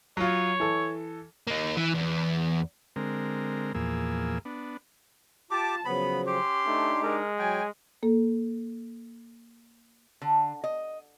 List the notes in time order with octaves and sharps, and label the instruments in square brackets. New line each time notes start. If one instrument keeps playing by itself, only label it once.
[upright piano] F#3 F4 [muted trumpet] C#5
[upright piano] E3 A4
[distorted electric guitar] A#3 D#4
E3
E2
[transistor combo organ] D3 G#3 C4 A#4
E2 A#2 F3 A#3 G#4 E6
B3 D4
[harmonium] F4 [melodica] G4 D6 [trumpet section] A5
[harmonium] C#3 F3 F#3 [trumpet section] B3 [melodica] B5
[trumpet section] C#4 C6 [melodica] G4
[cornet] A3 [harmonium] D4 D#4
[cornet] G#3 [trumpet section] A#4
[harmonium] F#3 [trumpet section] C#5 G#5 [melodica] G5
[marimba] A#3 A4
[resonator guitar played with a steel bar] D3
D#5